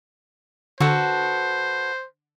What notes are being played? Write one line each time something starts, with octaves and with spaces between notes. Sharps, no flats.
D3 F#4 A4 B4 C5